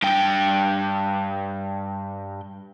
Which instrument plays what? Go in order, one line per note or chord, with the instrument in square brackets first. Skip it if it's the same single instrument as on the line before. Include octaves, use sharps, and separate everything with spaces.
[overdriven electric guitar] G2 G5